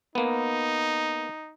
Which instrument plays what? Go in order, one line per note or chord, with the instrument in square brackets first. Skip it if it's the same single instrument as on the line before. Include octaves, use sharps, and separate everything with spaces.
[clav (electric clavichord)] A#3 B3 [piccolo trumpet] D#4